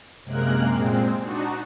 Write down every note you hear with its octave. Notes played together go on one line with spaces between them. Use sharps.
F#2 C3 G#3 A#3 A#4 F#6
A#2 G#3 C4
D4 D#4 F#4